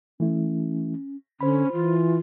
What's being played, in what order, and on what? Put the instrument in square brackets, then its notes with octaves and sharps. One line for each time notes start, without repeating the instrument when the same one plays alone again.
[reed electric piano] E3 A3 E4 [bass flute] C#4
[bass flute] D3 [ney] C#4 [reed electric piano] C5 B5
[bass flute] E3 [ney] F4